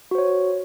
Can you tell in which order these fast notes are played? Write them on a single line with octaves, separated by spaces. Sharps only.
F#4 C5 C#5